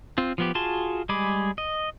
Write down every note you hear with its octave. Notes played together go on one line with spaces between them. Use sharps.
C4 F4
F3 B3 G4
F4 F#4 G#4 A5 C6
G3 G#3 G#4 B5 D6
D#5